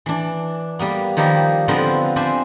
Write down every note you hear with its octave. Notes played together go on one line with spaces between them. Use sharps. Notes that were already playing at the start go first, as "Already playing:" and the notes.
E3 D4
G3 A#3 B3
D#3 F3 G3 A#3 D#4
D3 F3 B3 C4 A#4 B4
C4 D4 C5 E5 G#5